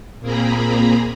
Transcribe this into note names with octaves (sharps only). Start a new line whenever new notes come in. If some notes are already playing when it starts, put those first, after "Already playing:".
A#2 A#3 C4 G#4 A#5 B5